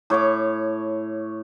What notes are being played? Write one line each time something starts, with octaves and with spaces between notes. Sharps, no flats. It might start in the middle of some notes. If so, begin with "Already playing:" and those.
A2 C#5 C#6 D6